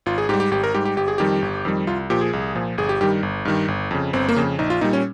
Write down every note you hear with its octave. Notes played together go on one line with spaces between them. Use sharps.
G#1 F4
G#4
G#2 G3 G4
G4
G#1 G4
A#4
G#2 G3 G4
G4
G1 G4
G#4
F2 D#3 G3 G4
G1
F2 D#3 G3
C2 F4
A#2 F3 G4
G#4
C2
A#2 F3
G1 G#4
G4
G2 D#3 G3 G4
G1
G2 D#3 G3
G1
F2 C#3
G1 C4
A#3
F2 C#3
A#1 D#4
F4
A#2 G3 D#4
C#4